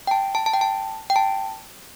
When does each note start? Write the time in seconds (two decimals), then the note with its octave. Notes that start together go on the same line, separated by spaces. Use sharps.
0.07 G5
0.11 A5
0.35 A5
0.46 A5
0.53 G5
0.61 A5
1.10 G5
1.16 A5